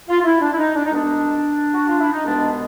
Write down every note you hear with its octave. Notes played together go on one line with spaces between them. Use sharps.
F4
F4
E4
D4
E4
D#4
D4
D#4
C2 B2 G#3 B3 D4
F#4
F4
E4
D#4
C2 B2 G#3 B3 D4